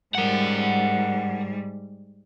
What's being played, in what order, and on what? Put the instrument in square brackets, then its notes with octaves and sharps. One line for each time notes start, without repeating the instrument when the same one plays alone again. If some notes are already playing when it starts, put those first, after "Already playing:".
[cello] G#2 G3 [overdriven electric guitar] A#4 F#5